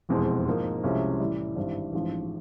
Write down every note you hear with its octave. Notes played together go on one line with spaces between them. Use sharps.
F1 E2 B2 G#3 C4
G#2 F3 A#3 D#4
C2 C3 F3 G#3 C#4
A2 E3 G3
G#1 G2 E3 G3
A1 G#2 F3